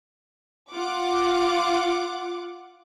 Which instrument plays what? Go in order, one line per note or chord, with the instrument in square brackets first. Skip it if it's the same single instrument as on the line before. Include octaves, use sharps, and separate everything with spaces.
[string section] F4 F#5 D6